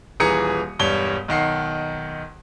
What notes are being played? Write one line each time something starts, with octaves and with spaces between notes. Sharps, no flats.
D#1 E3 G#4 A#5 D#6 C#7
E1 G2 G3 C#5 G7
B1 D#3 F#5 C7